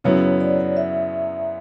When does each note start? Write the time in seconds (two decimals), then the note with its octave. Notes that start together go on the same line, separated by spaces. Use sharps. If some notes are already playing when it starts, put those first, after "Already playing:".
0.04 F#2 C#3 F#3 B3 E4 C#5
0.40 D5
0.77 E5